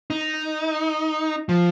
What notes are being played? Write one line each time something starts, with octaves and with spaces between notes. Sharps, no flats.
D#4
F3